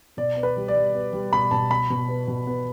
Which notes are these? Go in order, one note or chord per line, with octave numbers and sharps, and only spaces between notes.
B2 D5
B3
B4
G3
D5
G3
B3
G3
B2 B5
B2 A5
B2 B5
B2
B3
B2
B3